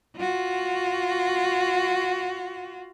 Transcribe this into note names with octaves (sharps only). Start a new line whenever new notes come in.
F4 F#4